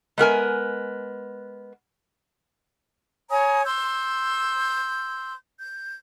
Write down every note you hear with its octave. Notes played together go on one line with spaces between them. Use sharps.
G#3 B3 A#4 G#5
C#5 G#5 A#5 D#6
C6 E6 G6
G6